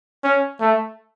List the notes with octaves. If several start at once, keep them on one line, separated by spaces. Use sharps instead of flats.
C#4
A3